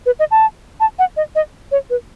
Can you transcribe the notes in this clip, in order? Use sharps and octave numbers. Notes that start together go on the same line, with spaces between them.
B4
D#5
A5
A5
F#5
D#5
D#5
C#5
B4